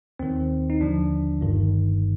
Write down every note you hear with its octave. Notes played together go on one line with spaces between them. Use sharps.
D#2 D#3 C4
D#4
D#2 D3 F3 D4
G1 G2 D#3